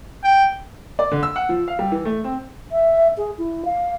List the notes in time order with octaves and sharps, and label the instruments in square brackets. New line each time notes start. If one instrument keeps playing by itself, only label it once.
[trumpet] G5
[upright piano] D5
D3
E6
F#5
F3
F5
G3
E3
A3
C4
[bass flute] E5
G#4
E4
F5